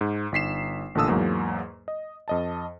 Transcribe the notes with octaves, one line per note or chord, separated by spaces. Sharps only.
G#2
G1 D#4 B6 C7 E7
A1 A#2 D3 A5 D#6 E6
E2 G#2 F#3 A#3
D#5
F2 D#5 A5